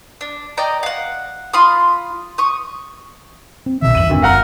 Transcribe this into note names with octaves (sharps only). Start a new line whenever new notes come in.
D4
D5 D#5 G5 A#5
F5 F#5
F4 B5 C6 D#6
C#6 D#6
C4
B1 B2 D#3 E5
E2 G2 E3 D#7 F#7
G#1 D3
F#1 A#4 F5 F#5 A#5